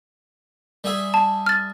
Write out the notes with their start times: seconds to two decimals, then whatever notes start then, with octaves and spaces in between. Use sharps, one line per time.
0.84 G3 G#4 E5
1.14 A5
1.46 F6 A6